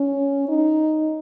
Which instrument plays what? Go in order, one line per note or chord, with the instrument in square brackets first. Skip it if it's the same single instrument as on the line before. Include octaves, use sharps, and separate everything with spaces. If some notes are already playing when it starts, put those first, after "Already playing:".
Already playing: [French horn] C#4
D#4